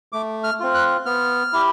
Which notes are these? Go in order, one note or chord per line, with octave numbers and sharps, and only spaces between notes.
A3 D6
F6
C4 F4
F#6
B3 F6
E4 G4